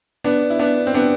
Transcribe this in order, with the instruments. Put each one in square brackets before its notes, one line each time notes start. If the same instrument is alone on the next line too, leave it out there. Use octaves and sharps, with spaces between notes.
[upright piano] B3 D4
E4
B3 D4
C4
B3 D4